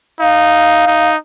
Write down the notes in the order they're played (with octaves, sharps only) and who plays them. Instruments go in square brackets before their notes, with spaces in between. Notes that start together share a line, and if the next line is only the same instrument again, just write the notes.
[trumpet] D#4 [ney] F5
[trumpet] D#4